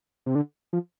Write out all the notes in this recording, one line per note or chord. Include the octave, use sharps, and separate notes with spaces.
C3
D3
F3